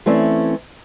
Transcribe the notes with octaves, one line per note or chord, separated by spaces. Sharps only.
E3 A3 C4 C#4 E4 D5